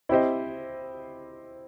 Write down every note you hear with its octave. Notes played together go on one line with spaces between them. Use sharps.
C4 E4 G4 C5 D#5